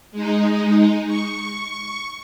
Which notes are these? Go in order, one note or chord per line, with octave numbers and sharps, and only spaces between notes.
G#3 D#4
C#6